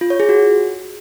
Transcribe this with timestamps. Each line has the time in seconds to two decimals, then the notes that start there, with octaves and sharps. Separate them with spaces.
0.01 F4
0.10 C#5
0.20 G#4
0.29 F#4